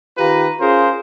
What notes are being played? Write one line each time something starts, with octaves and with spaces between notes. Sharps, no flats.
D#3 F4 G4 B4 A#5
C#4 F4 G#4 A#4 C5